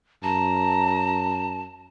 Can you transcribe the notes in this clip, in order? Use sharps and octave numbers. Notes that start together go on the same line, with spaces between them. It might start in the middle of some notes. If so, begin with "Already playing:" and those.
F#2 A5 A#5